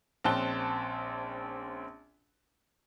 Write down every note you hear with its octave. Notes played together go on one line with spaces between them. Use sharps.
A#1 C4 C#4 A5 F#6 G7